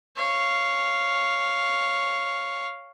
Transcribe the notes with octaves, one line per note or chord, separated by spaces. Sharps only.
C#5 F5